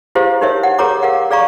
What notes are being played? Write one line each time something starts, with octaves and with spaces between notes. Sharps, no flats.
E4 G4 G#4 C5 F5
D#4 G4 A#4 C#5 E5
F#5
G4 G#4 A#4 C#5 A#5 D6
A#4 F5 F#5
G#4 D5 F5 A#5 C#6